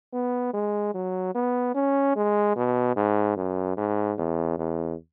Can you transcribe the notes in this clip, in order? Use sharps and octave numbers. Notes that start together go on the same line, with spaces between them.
B3
G#3
F#3
B3
C#4
G#3
B2
G#2
F#2
G#2
E2
E2